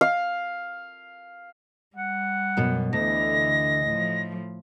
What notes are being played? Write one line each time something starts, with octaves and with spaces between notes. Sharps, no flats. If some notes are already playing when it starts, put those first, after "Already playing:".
F5
G3 F#5
F#2 B2
D2 D3 E3 D#5 A#6
A2 F3